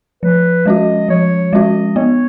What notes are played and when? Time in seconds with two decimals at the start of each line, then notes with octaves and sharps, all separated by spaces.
0.23 F3 B4
0.66 G#3 C#4 F#4 D#5
1.09 F3 C#5
1.53 G#3 C#4 F#4 D#5
1.96 B3 C#5